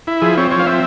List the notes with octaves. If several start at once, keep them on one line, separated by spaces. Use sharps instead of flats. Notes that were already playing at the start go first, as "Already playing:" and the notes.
E4
F3 G#4
C4 C#5
F3 C#5
F5
C4 E5